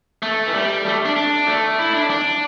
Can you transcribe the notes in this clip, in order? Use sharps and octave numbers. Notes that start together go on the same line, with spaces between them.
A3
E3
G3
A3
D4
D4
A3
E4
D4
D4